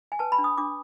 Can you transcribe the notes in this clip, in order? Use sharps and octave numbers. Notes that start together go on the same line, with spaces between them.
G#5
B4 A5
B5
D4
D#6
D4 D6